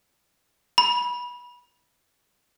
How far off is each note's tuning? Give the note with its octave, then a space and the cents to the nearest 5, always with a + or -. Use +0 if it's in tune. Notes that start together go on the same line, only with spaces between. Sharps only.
B5 -20